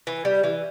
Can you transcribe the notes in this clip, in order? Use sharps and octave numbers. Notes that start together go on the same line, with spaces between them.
E3
G3
E3